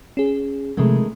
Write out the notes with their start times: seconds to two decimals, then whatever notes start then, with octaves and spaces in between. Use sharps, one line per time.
0.17 C#4 G#4
0.77 C3 D#3 F3 G#3 A3